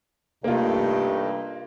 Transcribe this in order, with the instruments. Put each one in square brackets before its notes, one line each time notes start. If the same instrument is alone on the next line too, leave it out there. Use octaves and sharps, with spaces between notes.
[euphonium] G2 [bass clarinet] C3 [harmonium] A3 D#4 [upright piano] A#3 F4